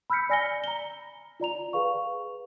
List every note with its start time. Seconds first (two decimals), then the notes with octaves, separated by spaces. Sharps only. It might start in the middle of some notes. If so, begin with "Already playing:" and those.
0.10 B5 E6 F6 G6 B6 C#7
0.29 D5 G#5 A#6 C#7 G7
0.64 A#5 G7
1.40 F4 D5 A#5 F7
1.73 G#4 B4 F5 C#6